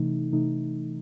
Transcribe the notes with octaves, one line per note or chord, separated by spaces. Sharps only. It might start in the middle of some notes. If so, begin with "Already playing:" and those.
Already playing: C3 E3 A3 D#4
C3 E3 A3 D#4